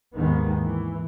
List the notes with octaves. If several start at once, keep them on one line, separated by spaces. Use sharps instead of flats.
D#2 G#2 D#3 B3
E3